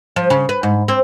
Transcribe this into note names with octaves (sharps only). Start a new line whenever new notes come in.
F3
C#3
B4
G#2
C4